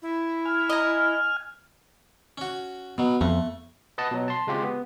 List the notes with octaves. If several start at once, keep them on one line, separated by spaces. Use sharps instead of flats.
E4
G#5 F6
D#5 A#5
C#4 F#4
B2 F#3 B3
F2 A3
B4 D#5 F#5 A5
B2 F#3
A5 C6
C#3 G#3 C4 F4 G4
B3